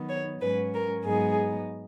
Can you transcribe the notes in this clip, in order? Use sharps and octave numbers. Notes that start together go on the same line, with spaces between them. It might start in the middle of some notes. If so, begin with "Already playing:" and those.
Already playing: D#3 F#3 B3 D#4
C#5
G#2 F#3 C#4 B4
A#4
G#2 F#3 B3 D#4 G#4